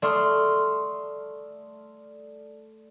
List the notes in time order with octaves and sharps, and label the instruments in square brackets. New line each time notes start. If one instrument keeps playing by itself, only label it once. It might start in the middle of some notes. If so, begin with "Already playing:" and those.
[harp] A3 D5 C6 D#6 F6